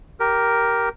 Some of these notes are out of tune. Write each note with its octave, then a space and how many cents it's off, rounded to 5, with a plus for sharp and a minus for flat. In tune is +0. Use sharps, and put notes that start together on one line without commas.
G4 -10 A#4 +5